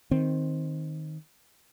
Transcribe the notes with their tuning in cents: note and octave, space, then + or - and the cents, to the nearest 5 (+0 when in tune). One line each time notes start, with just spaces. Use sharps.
D#3 +0 C4 +0